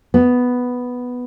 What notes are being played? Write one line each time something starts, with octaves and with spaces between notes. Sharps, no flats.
B3